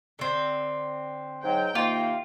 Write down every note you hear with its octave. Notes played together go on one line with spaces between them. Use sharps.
D3 C4
G#2 F#3 G5
C3 D#3 A#3 F4